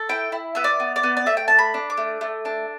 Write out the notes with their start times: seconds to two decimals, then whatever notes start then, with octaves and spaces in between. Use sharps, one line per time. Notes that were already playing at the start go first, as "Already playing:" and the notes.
Already playing: A4
0.09 E4 G5
0.32 E4
0.55 B3 E5
0.64 D5
0.80 B3
0.96 D5
1.03 B3
1.17 D5
1.26 A3 E5
1.37 G5
1.48 D4 A5
1.59 B5
1.74 D4
1.90 D6
1.97 A3
2.21 A3
2.45 D4